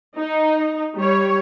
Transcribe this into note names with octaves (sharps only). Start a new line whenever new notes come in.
D#4
G3 C#5